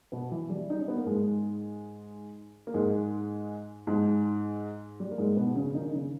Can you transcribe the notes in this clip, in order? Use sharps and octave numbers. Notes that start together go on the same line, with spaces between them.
B2 B3
E3
G3
D#4
C#4
B3
A#3
G#2 G#3
A#3
G#2 G#3
G#2 G#3
G3
A#3
G#2 G#3
B2 B3
C#3 C#4
D#3 D#4
C#3 C#4